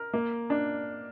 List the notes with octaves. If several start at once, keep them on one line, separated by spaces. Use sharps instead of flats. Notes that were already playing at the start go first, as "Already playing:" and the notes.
Already playing: A#4
A#3
D4